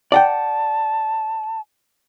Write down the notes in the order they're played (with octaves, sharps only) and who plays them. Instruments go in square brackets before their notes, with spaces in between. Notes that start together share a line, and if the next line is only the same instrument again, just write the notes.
[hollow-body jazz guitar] D5 F#5 G5 [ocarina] A5